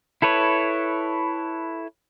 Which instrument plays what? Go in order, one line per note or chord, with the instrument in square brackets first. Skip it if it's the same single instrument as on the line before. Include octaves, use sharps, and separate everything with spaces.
[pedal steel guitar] E4 A4 B4 C#5